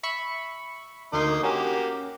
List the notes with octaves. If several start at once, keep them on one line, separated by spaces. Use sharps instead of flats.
E5 B5 C#6
D2 A#3 D#4 C6
A#3 C#4 F#4 G4